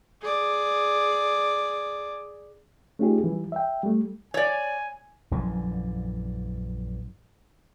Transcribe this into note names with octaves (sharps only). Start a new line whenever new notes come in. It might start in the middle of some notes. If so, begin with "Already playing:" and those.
G#4 D5
A3 C#4 D#4 F4 G4 G#4
E3 G3
E5 G5
G3 A3
C#5 D5 G#5
A#1 F#2 D3 E3